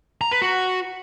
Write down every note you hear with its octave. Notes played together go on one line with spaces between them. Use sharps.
A#5
B4
F#4